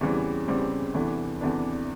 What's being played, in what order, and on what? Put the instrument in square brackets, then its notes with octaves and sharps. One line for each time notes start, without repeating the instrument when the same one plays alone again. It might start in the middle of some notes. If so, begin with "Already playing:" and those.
[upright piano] E2 C#3 E3 G3 C4
E2 C#3 E3 G3 C4
E2 C3 E3 A3 D4
E2 C3 E3 A3 D4